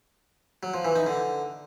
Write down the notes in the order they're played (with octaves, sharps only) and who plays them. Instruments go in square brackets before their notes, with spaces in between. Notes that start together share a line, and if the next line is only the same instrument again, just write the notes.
[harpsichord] F#3
F3
E3
D#4
D3